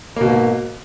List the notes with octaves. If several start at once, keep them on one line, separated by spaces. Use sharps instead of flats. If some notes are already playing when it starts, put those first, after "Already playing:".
G#2 B2 A#3